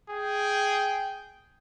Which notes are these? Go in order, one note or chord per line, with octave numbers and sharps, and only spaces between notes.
G#4 G5